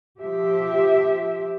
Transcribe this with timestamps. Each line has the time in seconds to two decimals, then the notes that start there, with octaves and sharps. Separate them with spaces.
0.20 F3 G4 E5